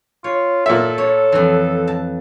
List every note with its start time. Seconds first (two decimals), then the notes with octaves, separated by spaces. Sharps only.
0.24 F4 C#5
0.66 A#2 A4 E5
0.98 C#5
1.32 F2 E3
1.87 A5